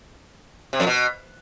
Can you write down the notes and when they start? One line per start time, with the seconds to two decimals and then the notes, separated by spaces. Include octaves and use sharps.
0.73 C3
0.80 F2
0.87 B2